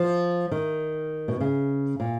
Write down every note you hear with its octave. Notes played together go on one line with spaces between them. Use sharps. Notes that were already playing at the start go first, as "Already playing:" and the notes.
Already playing: F3
D#3
B2
C#3
A#2